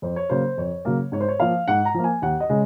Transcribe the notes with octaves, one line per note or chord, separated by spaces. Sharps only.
F2 C5
C#5
C#3 F#3 A#3 C5
F2 C#5
C#3 F#3 A#3
G#2 C#5
C5
C#5
F3 A#3 F5
G#2 F#5
A#5
F3 A#3
G#5
D#2 F#5
D#5
C#3 G#3